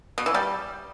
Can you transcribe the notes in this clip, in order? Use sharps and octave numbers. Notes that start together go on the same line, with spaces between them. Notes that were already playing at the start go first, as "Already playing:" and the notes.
B2
E3
G3